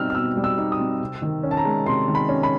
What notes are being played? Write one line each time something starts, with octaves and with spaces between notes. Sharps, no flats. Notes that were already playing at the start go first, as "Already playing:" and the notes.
Already playing: B2 G3 C4 D#4 E6 F6
F6
B2 E6
G3
E6
D#4
D#6
C4
C3
D#3
C#4
A5
A#5
G#3
C3 C6
D#3
B5
C#4
B5